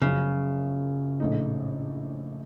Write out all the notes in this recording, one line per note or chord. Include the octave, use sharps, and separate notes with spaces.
F#1 F#2 C#3 F3
A#1 A2 A3 D#4